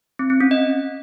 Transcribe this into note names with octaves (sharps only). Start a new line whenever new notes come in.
C4
C4
C#4
D#5